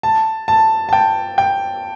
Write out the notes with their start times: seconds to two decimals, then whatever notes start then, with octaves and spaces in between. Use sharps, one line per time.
0.03 A5
0.48 A5
0.89 A5
0.93 G5
1.38 G5